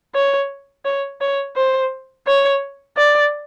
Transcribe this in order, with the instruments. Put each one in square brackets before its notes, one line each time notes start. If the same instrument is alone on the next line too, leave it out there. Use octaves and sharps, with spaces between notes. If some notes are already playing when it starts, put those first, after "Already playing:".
[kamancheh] C#5
C#5
C#5
C5
C#5
D5